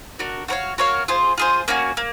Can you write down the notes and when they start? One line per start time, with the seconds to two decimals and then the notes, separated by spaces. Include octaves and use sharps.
0.19 D4 F#4 A#4
0.48 F#4 A#4 C#5 F5
0.78 F#4 A#4 C#5 F5
1.08 F4 G#4 C5
1.38 F4 G#4 C5
1.68 A#3 C#4 F#4
1.97 A#3